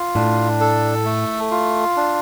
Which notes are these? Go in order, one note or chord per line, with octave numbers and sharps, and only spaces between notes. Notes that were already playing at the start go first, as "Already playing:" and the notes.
Already playing: F4
A2 D4
A4
A3
F4
D4